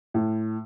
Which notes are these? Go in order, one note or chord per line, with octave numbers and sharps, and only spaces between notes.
A2